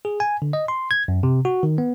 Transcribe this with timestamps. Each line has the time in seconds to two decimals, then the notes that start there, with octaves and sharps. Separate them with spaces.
0.05 G#4
0.20 G#5
0.42 D3
0.53 D#5
0.68 C6
0.91 G#6
1.08 F#2
1.23 C3
1.45 F#4
1.63 D#3
1.78 B3